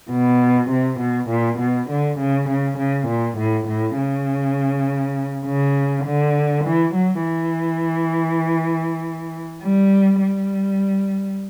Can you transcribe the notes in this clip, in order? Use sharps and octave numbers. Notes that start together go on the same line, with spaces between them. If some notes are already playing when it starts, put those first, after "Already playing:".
B2
C3
B2
A#2
B2
D3
C#3
C#3
C#3
A#2
A2
A2
C#3
C#3
D3
E3
F#3
E3
G3
G3